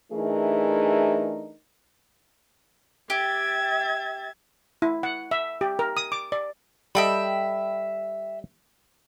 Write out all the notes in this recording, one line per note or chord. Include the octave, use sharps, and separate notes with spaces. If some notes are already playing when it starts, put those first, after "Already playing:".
E3 A3 D4 D#4 G#4 A#4
G4 E5 G#6 A6
E4
F#5
E5
G4
A#4
D#6
D6
D5
G3 A4 D#5 E5 G5 B5